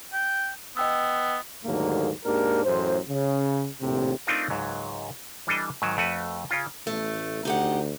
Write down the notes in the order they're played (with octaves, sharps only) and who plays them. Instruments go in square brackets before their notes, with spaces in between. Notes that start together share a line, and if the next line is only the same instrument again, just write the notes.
[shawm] G5
[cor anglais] B3 [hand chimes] D#5 G5 E6
[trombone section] D#2 G#2 D3 F#3 A3 A#3
G#2 A#3 D4 G4 A#4
A1 F#2 A2 C5
C#3
A#1 D#2 A2 C3
[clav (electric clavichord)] A3 C4 D4 D#4 F4 A#4
C#2 G#2 F#3
E3 G3 D4 A4 D#5
G#2 D#3 F#3
F2 A3 F#4 B4
C#3 C#4 F4 G5
[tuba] A1 [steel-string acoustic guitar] A3
[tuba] D2 [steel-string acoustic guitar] D#4 G4 F#5